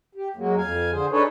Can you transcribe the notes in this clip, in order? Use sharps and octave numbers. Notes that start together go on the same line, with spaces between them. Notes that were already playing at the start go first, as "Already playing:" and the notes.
G4
F#2 F#3 G#3 A#3
F2 F5 G#5
D3 G#4 C5
D4 D#4 G#4 A4 B4 C#5